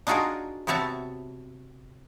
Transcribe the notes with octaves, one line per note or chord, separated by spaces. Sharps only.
D4 D#4 F4 F#4 G#4 A#4
C3 B3 F#4 C#5 E5 A5